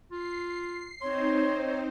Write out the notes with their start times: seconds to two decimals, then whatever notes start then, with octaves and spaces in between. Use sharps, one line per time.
0.11 F4 C7
1.02 C4 D#4 C5 C#5 C6